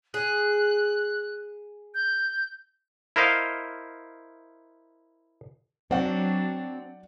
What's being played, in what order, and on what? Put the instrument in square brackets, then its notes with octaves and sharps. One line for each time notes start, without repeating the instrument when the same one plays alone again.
[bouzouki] G#4 [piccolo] F#6
[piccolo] G6
[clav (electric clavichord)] E4 A#4 C5 D#5 F5
[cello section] F#3 D4 [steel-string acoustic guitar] C4 [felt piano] D5 F#5